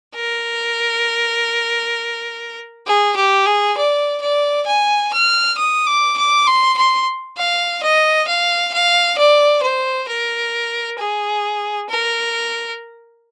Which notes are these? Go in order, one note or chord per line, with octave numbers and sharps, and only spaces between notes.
A#4
G#4
G4
G#4
D5
D5
G#5
F6
D#6
D6
D6
C6
C6
F5
D#5
F5
F5
D5
C5
A#4
G#4
A#4